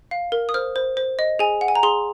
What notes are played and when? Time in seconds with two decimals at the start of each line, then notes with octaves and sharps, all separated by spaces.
0.11 F5
0.32 A#4
0.49 D#6
0.54 C5 F6
0.76 C5
0.97 C5
1.19 D#5
1.39 G#4 G#5
1.61 F#5
1.68 G#5
1.75 A#5
1.83 G#4 C6